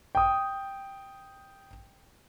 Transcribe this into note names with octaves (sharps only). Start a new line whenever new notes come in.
G5 D#6